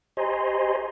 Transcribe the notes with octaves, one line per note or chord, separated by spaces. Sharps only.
G4 C5 D#5 G#5 A#5 C6